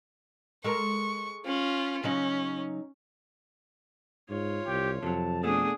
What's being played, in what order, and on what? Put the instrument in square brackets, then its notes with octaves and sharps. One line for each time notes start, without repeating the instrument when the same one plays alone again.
[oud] G#3 A4 A#4 [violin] C#6
[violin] C#4 F4
[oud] C#3 F#3 D#4 [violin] C#4
[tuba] G#2 [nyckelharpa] F4 C#5
[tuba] C2 [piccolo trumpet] G4
[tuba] F2 [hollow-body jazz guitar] C3 F#3 [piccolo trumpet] A5
[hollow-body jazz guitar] B2 A3 [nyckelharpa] D4 G#4 [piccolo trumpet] D#6